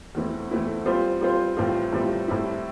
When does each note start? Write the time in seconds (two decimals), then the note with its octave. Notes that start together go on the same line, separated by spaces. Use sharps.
0.15 E2 E3 A3 C4 E4
0.51 E2 E3 A3 C4 E4
0.86 G3 C4 F4 C5
1.21 G3 C4 F4 C5
1.57 A2 E3 G3 C4 F4
1.93 A2 E3 G3 C4 F4
2.28 A2 G3 C4 E4